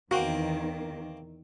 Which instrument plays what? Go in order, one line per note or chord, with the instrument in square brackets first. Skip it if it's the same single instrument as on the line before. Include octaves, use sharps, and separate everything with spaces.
[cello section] E2 D#3 [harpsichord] A#3 C4 [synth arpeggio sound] F#4